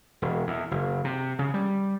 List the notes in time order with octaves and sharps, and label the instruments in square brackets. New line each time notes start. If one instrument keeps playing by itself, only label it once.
[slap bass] E1
E2
F#1
C3
C#3
G3